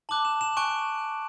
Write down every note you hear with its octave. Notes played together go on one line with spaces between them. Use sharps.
A5 D6 F#6 F#7
E7
E7
G#5 C#6 F#6 D7